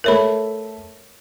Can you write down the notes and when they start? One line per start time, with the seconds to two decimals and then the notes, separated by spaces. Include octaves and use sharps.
0.04 A3 A#4 C#5 E5 B5